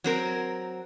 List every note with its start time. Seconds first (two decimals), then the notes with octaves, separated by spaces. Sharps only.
0.04 F#3 C4 A#4